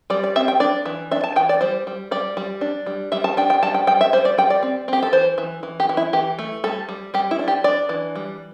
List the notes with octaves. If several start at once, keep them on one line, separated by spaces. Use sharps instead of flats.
G3 D5
D5
C4 E5
G5
D4 D5
E3
D4 E5
A5
E3 G5
D5
G3 C5
G3
G3 D5
G3
D4
G3
G3 E5
A5
D4 G5
G5
G3 A5
G5
G3 G5
E5
G3 C5
D5
G3 G5
D5
C4
C4 G4
A4
E3 C5
E3
E3
G4
E3
E4
E3 G4
A3
G3 A4
G3
G3 G4
E4
D4
G4
D4 D5
E3
G3